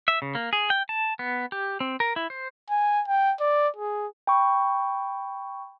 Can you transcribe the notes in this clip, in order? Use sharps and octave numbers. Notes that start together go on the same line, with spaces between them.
E5
C#3
A#3
G#4
G5
A5
B3
G4
C4
A#4
E4
C5
G#5
G5
D5
G#4
G5 B5 C#6